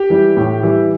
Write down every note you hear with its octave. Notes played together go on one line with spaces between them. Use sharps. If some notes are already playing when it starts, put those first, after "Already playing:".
Already playing: G4
E3 G3
A2
E3 G3